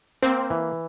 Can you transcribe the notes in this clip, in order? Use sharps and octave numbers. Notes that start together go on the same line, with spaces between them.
A#3 C4
E3